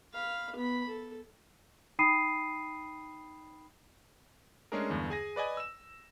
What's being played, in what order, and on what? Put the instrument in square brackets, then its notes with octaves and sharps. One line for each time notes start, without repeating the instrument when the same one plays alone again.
[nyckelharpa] F5 B5
B3 B5
A4
[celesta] D#4 G5 B5 D#6 C7 D#7
[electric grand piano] G#3 A3 C#4 D4 G#4 A#4
E2 G2 D3
G#4 G#5 A#6
B4 D5 D#5 G#5
E6 E7